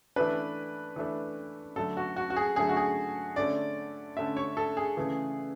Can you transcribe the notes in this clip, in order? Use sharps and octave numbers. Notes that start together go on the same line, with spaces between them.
E3 A3 D4 B4
E3 A3 D4
D3 F#3 A3 A4
F#4
F#4
F#4
G#4
D3 F#3 A3 G#4
F#4
G#4
D3 A3 C#4 D5
D3 A3 C#4 E5
C#5
A4
G#4
C#3 E3 A3